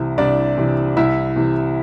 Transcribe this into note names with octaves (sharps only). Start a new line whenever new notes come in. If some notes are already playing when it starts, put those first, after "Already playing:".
Already playing: C2 C3 E3 E4
C2 D4 D5
C3 E3
C2 E4 E5
C3 E3